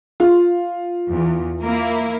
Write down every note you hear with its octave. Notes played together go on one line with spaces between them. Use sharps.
F4
E2
A#3 E4 A#4